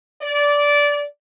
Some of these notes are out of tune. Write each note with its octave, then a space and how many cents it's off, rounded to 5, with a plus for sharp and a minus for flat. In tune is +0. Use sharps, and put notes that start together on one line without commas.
D5 -15